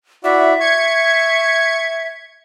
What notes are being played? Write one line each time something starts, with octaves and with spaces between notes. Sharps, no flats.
E4 F#4 D5 E5
C#6 G#6 C#7